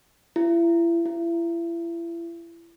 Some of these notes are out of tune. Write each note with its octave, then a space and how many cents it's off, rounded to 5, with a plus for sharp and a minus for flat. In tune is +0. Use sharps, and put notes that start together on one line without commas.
E4 +35
E4 +35